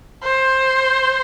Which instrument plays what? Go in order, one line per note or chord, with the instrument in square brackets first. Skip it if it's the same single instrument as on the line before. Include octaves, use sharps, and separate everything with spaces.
[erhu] C5